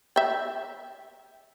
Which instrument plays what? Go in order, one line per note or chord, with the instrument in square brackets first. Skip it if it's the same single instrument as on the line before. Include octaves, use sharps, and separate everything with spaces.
[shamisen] E5 G5